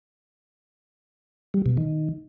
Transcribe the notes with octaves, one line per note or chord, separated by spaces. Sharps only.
G3
B2
D#3